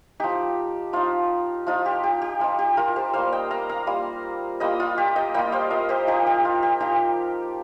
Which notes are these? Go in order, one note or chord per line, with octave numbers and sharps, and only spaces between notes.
F3 D#4 G4
F3 D#4 F4
F3 D#4 F4
G4
G4
G4
F3 D#4 F4
G4
F4 A#4
G4 C5
G3 A#3 F4 C5 F5
D#5 G5
F5 A#5
F5 A#5
G3 A#3 F4
G3 A#3 F4 D#5 G5
F4
G4
D#5 G5
G3 A#3 F4 D#5 G5
C5 F5
A#4 D#5
G4 C5
F3 D#4 G4
G4
F4
G4
F3 D#4 G4